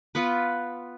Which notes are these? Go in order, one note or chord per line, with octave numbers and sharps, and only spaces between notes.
B3 F4 B4